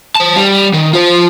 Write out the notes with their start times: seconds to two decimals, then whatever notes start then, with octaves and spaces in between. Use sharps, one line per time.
0.15 C5 A5
0.36 G3
0.73 D#3
0.93 F4 C5